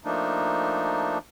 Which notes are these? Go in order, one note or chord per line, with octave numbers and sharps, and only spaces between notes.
F3 A3 A#3 D4 D#4